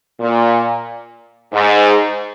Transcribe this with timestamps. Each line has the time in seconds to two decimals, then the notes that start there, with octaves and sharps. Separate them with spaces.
0.20 A#2
1.53 G#2